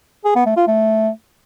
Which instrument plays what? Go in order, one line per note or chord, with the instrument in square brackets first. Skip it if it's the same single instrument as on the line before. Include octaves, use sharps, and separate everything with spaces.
[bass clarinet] G#4
B3
A3
F4
A3